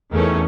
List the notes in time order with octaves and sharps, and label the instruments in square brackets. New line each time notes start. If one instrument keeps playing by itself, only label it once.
[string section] E2 D#3 A3 C#4